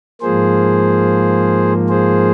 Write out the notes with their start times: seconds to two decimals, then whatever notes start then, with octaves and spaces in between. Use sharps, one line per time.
0.22 G#2 F3 A#3 G#4 C5
1.89 G#4 C5